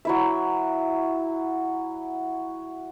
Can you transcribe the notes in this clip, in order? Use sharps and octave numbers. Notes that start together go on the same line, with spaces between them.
F#3 E4 E5